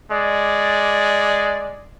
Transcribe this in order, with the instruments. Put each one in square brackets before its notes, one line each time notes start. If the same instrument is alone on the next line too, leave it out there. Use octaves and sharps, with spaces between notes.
[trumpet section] G#3 D5